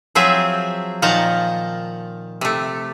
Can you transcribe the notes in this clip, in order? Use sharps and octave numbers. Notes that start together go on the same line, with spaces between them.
F3 F#3 C4 G#4 E5
A#2 D#3 F3 F#5 A5 A#5
C3 A3